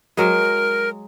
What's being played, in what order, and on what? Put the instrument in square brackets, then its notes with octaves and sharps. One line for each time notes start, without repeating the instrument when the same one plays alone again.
[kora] F#3 G#3 [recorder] A#4